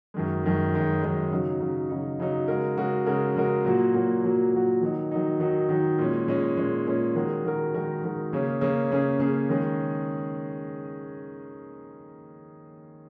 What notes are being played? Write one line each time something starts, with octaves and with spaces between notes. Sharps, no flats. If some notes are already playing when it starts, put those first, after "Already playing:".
F#2 D#3 G#3
F#2 D#3 G#3
F#2 D#3 G#3
F#2 D#3 G#3
C#3 F#3 D#4
C#3 F#3 D#4
C#3 F#3 D#4
C#3 F#3 D#4
C#3 G#3 F#4 A#4
C#3 G#3 F#4 A#4
C#3 G#3 F#4 A#4
C#3 G#3 F#4 A#4
A#2 F#3 A#3 F#4
A#2 F#3 A#3 F#4
A#2 F#3 A#3 F#4
A#2 F#3 A#3 F#4
D#3 F#3 D#4
D#3 F#3 D#4
D#3 F#3 D#4
D#3 F#3 D#4
A#2 G#3 C#4
A#2 G#3 C#4
A#2 G#3 C#4
A#2 G#3 C#4
D#3 G#3 F#4 A#4
D#3 G#3 F#4 A#4
D#3 G#3 F#4 A#4
D#3 G#3 F#4 A#4
C#3 A#3 C#4 G#4
C#3 A#3 C#4 G#4
C#3 A#3 C#4 G#4
C#3 A#3 C#4 G#4
D#3 G#3 C#4 G#4